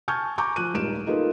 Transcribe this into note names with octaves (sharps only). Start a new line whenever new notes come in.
G#5 A5 C#6 F6 G6 G#6
G#5 A#5 C#6 D6 G6
F3 F#6 D#7
D#1 G2 G#3 D7 E7
A#3 D#4 F4 G#4 A4 B4